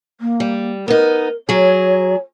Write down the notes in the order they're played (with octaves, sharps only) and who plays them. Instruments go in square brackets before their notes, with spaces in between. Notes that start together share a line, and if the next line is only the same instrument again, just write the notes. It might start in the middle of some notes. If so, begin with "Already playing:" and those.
[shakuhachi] A#3
[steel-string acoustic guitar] G3
[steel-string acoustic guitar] B3 D#4 [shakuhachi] A#4
[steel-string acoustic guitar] F#3 G#4 [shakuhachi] C#5